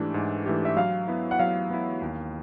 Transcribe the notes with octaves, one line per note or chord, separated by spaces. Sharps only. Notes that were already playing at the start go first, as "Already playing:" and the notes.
Already playing: G#2 E3 A3 D4 G4
G#2
E3 A3 D4 G4
E5
F#3 F5
B3 E4
F#5
F#3 F5
B3 E4
D#2